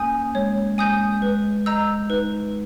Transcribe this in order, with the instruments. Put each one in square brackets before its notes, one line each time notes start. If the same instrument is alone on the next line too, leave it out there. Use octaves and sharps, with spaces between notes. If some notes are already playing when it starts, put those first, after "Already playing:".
Already playing: [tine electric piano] A#3 C#4 [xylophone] G#5 D#6 G6
[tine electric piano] G#3 [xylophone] C#5
[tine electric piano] G#3 [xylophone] G#5 D#6 G6
[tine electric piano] G#3 [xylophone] B4
[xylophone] D#5 A#5 E6 G6
[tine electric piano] D#4 [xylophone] B4